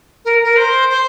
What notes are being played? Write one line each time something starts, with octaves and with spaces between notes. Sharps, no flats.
A#4
A#4
C5
C5